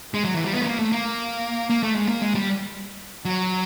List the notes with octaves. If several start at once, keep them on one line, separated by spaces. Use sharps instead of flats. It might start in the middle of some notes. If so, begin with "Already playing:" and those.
G#3
F#3
E3
G3
B3
A3
A#3
A3
A#3
A#3
A3
G#3
A#3
G#3
G3
F#3